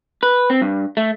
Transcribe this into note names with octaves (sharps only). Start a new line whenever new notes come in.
B4
C4
G2
A3